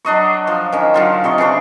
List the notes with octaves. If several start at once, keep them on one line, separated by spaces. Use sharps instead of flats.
F#3 D4 D#5 C#6
F3
D#3 C#4
D3 F#3 F4
C3 D#5 C#6
C#3 E3 D4 C#6